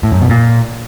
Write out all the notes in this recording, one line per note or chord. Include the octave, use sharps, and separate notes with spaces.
A2
F#2
B2
A#2